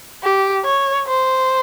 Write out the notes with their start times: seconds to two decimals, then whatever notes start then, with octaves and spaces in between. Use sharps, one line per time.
0.23 G4
0.65 C#5
1.07 C5